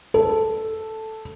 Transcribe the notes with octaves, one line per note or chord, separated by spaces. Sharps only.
A4